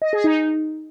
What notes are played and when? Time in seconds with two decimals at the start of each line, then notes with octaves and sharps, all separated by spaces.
0.02 D#5
0.13 G#4
0.24 D#4